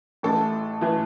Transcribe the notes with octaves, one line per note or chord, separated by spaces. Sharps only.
A1 A2 E3 A4
A2 E3